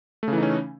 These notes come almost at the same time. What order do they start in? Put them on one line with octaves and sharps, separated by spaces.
A3 C#3 E3 D#4 C#4